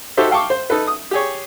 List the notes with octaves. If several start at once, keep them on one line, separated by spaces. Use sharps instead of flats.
D#4 F#4 G4 A4 C5 E5
F5 G5 A5 C#6 D6
C5
D#4 A4 B4
D#6
G4 G#4 C#5